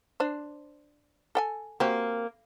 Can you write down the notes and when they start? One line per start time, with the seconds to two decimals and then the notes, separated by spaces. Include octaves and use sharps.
0.20 D4 C5
1.35 A4 G5 G#5
1.80 A#3 C4 F#4 G4